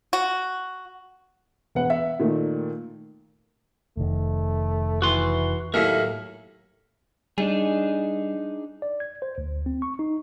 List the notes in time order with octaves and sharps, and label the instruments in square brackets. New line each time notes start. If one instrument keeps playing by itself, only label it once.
[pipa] F#4
[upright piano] E1 B4 F#5
E5
A#2 D#3 A3
[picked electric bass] F1 D#3 [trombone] A3
[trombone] E3 [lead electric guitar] F#4 C6
[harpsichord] D#2 A2 [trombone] F#3 [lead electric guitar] A#4
[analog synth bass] G3 [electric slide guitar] D4 D#4 G#4
[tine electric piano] D5
G#6
C5
D2
C4
C#6
D#4